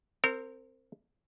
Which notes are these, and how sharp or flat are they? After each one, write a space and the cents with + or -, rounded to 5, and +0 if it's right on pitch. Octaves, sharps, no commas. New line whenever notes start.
C4 +0 A#4 -30